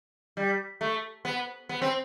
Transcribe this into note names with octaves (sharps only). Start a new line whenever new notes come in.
G3
A3
B3
B3
C4